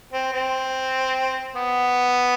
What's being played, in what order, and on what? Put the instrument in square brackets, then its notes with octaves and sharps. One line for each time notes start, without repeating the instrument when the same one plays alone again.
[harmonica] C4
C4
B3